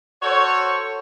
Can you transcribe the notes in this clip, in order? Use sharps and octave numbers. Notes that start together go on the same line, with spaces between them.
F#4 A4 C5 C#5